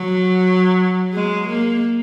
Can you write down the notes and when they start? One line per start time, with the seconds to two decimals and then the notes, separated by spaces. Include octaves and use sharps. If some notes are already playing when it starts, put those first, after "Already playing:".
Already playing: F#3
1.14 G#3
1.47 A#3